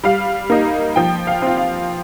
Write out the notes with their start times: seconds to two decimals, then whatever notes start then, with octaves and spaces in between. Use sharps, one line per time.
0.04 G3 F5
0.50 A#3 D#4
0.96 F3 G5
1.27 F5
1.42 C4 F4
1.57 F5